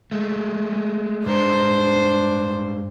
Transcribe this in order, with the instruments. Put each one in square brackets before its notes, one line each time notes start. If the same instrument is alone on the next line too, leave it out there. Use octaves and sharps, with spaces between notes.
[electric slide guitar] G#3 A3
[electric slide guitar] G2 G#3 A#5 [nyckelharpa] D4 C5